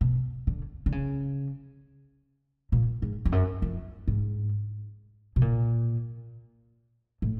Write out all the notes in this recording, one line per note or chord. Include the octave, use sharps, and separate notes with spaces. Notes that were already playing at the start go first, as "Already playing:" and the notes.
B2
D3
D3
C#3
A#2
G#2
F2
F#2
F2
G#2
B2
A#2
A2